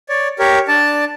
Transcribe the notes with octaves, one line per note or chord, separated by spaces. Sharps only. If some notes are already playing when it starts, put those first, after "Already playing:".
C#5 D5
G4 A#4 C#5
D4 D5 A5